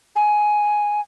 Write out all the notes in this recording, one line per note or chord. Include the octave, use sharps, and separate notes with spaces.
G#5